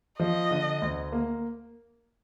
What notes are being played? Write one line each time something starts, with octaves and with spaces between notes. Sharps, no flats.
F3 D#5
D3
D2
A#3